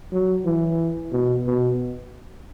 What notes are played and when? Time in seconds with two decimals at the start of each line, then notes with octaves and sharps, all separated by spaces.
0.13 F#3
0.45 E3
1.13 B2
1.46 B2